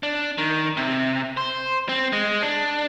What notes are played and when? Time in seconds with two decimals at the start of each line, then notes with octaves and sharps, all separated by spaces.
0.03 D4
0.38 D#3
0.77 C3
1.37 C5
1.89 C4
2.13 G#3
2.42 D4